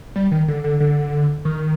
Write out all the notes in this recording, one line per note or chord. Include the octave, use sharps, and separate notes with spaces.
G3
D#3
D3
D3
D3
D#3